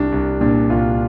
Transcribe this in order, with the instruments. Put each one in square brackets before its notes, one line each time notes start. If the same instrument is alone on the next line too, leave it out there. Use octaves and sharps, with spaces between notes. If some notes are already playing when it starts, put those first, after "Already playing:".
Already playing: [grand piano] C2 D4
C2
A#2 D4
C2 F4